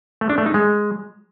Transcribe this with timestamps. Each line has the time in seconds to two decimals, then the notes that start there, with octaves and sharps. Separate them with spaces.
0.21 A3
0.30 D4
0.38 A3
0.46 D#4
0.54 G#3